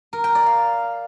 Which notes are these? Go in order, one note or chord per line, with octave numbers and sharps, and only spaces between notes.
A#4
G5
D5
F5